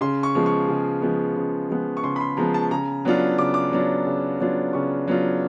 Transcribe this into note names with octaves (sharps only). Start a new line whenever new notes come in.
C#3 C6
C#6
F3 G#3 B3
C#6
C#3
F3 G#3 B3
C#3
F3 G#3 B3
C#6
C#3 C6
B5
C6
F3 G#3 B3 A#5
A5
C#3 A#5
F#3 B3 D4 F4
C#3 D6
D6
F#3 B3 D4 F4
C#3
F#3 B3 D4 F4
C#3 C#6
F#3 B3 D4 F4